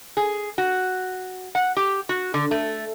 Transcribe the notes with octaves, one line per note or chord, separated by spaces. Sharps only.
G#4
F#4
F#5
G4
F#4
D3
A3